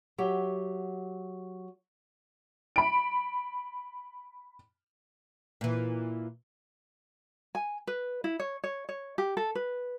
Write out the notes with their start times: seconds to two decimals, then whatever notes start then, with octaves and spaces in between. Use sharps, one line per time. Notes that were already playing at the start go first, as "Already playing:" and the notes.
0.18 F#3 G4 E5
2.76 B5 D7
5.61 A#2 E3
7.55 G#5
7.87 B4
8.24 E4
8.40 C#5
8.64 C#5
8.89 C#5
9.18 G4
9.37 A4
9.55 B4